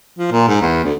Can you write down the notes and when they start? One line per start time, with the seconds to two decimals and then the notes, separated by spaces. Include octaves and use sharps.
0.19 F3
0.32 A#2
0.48 G#2
0.62 E2
0.84 D2